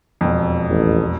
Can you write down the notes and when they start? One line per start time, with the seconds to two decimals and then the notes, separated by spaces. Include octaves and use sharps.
0.21 E1 F2
0.69 A1